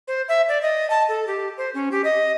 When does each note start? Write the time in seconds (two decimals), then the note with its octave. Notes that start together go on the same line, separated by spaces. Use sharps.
0.08 C5
0.28 E5
0.48 D5
0.62 D#5
0.90 A5
1.09 A4
1.27 G4
1.58 C5
1.74 C#4
1.92 G4
2.04 D#5